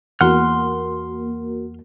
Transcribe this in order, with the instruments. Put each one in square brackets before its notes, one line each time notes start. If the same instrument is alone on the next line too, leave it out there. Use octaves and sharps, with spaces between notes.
[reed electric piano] E2 F#5 [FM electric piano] A#3 F#4 A#4 [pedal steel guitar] C6 F6